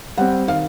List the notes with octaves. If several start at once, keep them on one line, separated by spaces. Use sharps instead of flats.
G3 C4 F#5
D#3 F5